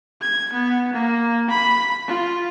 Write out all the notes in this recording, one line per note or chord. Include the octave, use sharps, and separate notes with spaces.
G#6
B3
A#3
B5
F4